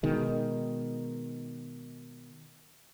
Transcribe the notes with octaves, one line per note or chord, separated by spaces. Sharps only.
B2 D#3 G#3